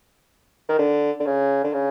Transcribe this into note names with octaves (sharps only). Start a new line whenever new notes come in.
D#3
D3
D3
C#3
D3
C#3